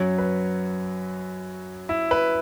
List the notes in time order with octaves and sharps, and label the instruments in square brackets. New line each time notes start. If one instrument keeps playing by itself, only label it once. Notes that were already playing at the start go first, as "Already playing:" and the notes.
Already playing: [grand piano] F#2 F#3 C#5
B4
E4
B4